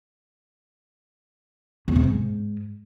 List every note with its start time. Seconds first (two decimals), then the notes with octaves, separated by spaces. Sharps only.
1.88 E2
1.96 C3
2.03 G#2